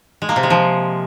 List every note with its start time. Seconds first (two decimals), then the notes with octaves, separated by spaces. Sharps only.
0.22 G#3
0.29 A#3
0.36 C3
0.43 G#3
0.50 F3